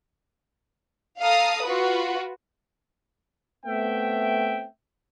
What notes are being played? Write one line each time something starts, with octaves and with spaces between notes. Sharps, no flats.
A4 F5 A#5 D#6
F4 F#4 B4
A3 B3 C4 E5 G5